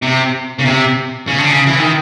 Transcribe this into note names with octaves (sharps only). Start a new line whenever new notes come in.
C3
C#3
C3
C#3
D3
C#3
E3
D#3